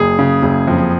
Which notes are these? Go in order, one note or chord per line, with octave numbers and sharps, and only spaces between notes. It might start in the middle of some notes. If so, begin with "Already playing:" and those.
Already playing: F#1 G#4
C#3
F#1
F2